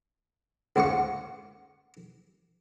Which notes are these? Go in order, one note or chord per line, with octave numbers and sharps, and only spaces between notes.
C#2 G#2 F5 F#5 C#6